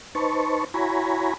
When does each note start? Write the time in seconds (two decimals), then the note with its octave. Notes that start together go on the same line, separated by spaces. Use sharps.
0.15 D#4 B4 C5 A5 C#6
0.74 E4 F#4 C#5 G#5 A#5 B5